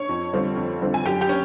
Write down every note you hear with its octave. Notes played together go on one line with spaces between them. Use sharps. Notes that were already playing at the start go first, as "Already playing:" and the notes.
Already playing: C#5 C#6
F2
D3 G3 C4 F4
F2
D3 G3 C4 F4
G#5
F#2 G4 G5
G4 G5
C#4